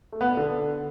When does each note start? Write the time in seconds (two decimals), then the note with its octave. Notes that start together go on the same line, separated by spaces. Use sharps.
0.12 A3
0.21 B3
0.29 D4
0.37 D3